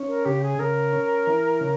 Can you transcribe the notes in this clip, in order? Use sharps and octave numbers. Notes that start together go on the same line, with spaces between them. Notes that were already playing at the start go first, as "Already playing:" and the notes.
Already playing: C#4
A#4
C#3 G4
G#4
C#3 A#4
C#4
E3
C#3